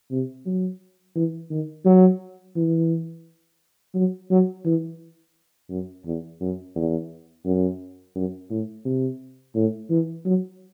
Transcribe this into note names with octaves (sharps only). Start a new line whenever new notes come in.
C3
F#3
E3
D#3
F#3
E3
F#3
F#3
E3
F#2
E2
F#2
E2
F#2
F#2
A2
C3
A2
E3
F#3